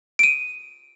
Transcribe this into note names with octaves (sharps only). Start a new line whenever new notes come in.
D7 D#7